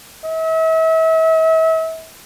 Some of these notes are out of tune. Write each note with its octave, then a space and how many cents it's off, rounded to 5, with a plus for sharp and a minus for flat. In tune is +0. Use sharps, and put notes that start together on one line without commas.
E5 -40